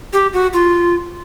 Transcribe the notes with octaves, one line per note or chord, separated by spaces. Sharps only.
G4
F#4
F4